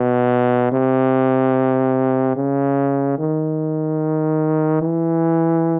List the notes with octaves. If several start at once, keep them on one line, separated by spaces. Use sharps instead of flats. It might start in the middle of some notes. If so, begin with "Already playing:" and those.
Already playing: B2
C3
C#3
D#3
E3